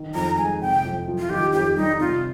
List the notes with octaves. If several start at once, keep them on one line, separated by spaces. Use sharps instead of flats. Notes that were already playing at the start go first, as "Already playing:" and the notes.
Already playing: D#3
F2 A#5
G#3 G#5
C3 G5
F2
F3
F4
D#3 G4
F2 G4
G3 D#4
C3 F4